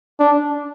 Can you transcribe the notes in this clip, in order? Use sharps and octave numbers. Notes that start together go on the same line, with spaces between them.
D4